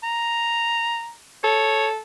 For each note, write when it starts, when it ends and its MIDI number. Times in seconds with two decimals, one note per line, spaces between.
0.04 1.12 82
1.44 2.00 69
1.44 1.87 73